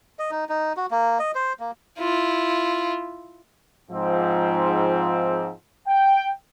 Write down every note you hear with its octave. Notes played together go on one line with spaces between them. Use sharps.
D#5
D#4
D#4
F#4
A#3
D#5
C5
A#3
E4 F4
G#2 F3 C4
G5